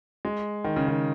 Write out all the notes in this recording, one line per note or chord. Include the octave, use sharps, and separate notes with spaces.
G#3
D#3
C#3
D#3